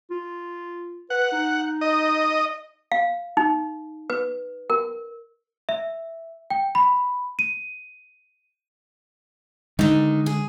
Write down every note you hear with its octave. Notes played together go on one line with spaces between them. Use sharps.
F4
B4 F#5
D#4
D#5
F5
D#4
B4
A#4
E5
G5
B5
D#7
D3 D#3 G#3 D#4
G#4